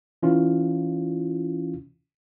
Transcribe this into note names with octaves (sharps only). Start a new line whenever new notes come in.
E3 C#4 E4 F4